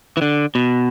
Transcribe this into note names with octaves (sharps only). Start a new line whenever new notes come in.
E3
D3
B2